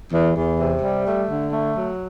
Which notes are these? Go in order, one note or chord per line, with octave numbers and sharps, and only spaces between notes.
E2
E2
C3
G3
A3
D3
A3
F#3